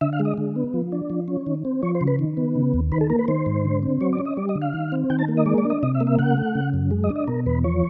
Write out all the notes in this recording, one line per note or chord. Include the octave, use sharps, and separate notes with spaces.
D3 E5
F5
G#3
D#5
D3
B3
F3
D4
F3
C#4
D#3
C4
F3 C#5
C5
C#3
B4
D#3
B3
C#3
D#2
D#3 B4
A4
A#3 A#4
B4
D#3 C5
G#2
D3
C4
F#3 C#5
D5
C#4
D#5
G3 D5
D#5
D3
F5
D#3
C4
D#3 G5
A5
A#3
D#5
G#3 D5
D5
D4
D#5
C3 D#5
E5
A#3
E5
C#3 F#5
A3
C#3
F#2
G#3
D#5
D4
D#5
B2 A#4
E2 B4
F3 C#5